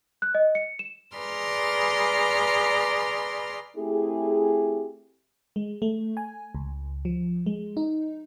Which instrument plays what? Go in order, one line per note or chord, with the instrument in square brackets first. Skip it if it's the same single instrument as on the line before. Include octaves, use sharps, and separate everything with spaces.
[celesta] F#6
D#5
C#7
E7
[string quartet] G#4 B4 D5 A#5 C6 F6
[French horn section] A3 C4 E4 G4 G#4
[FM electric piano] G#3
A3
G#5
C#2
F3
G#3
D#4